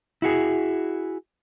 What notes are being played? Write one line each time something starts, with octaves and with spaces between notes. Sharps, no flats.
E4 F#4 G#4